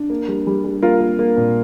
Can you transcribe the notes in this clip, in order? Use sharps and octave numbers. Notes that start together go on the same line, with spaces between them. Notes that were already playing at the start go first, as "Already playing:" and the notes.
Already playing: D4
A#3
G3
G3
G3
A#3 F4 A#4
A#3
A#3
A#2